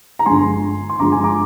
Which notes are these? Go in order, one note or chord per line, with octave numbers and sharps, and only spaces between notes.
A#5
G1 G2 F3 G#3 G#5 C6
C6
G1 G2 F3 G#3 A#5 D6
G#5 C6
A#5 D6